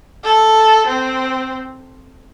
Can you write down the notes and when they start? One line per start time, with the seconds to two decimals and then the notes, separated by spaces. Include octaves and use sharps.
0.24 A4
0.87 C4